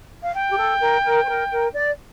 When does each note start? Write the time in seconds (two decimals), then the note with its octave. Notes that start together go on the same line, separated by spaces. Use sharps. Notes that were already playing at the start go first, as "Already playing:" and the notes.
0.23 F5
0.34 G5
0.50 G4
0.57 A4
0.81 A#4
1.04 A#4
1.24 C5
1.28 A#4
1.51 A#4
1.75 D5